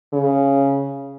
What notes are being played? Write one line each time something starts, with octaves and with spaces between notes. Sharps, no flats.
C#3